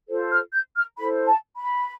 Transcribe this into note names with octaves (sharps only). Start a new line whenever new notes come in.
F4 A4 C5
F6
G6
F6
E4 A4 C5 B5
A5
B5